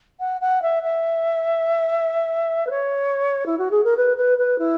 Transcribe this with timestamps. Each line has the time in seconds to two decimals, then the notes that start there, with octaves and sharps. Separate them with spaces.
0.20 F#5
0.41 F#5
0.62 E5
0.83 E5
2.67 B4
2.70 C#5
3.46 E4
3.58 F#4
3.71 G#4
3.84 A#4
3.97 B4
4.17 B4
4.38 B4
4.58 E4